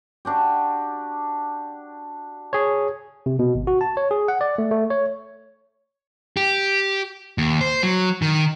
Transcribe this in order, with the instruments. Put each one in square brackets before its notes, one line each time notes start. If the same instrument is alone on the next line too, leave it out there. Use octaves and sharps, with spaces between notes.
[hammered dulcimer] D4 F#4 G4
[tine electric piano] G#4 C#5
C3
B2
G#1
F#4
A5
C#5
G#4
F#5
D5
A3
A3
C#5
[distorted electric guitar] G4
D#2
C5
F#3
D#3